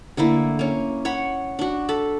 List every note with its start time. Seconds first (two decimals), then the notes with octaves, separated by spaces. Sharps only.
0.17 D3 A3 A#3 E4
0.59 A#3 C#4
1.05 C#5 F#5 B5
1.59 D4 F#4
1.89 A4 A5 B5